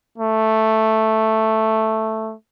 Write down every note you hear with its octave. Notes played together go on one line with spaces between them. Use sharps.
A3